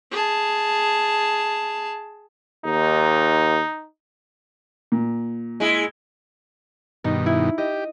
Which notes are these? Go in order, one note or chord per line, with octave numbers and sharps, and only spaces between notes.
G#4 A5
D#2 D#4
A#2
G#3 E4
G2 B2 D#3 D#4
E4
G4 D#5